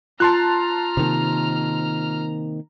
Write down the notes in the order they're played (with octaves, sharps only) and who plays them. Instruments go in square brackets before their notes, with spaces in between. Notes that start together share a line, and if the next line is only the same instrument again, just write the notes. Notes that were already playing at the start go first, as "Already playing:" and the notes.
[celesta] F4 [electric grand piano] A5 C6 F#6 [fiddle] A#5 F6
[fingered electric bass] C3 D#3 A#3